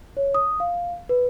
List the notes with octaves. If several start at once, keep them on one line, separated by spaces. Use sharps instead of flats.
C#5
D#6
F5
B4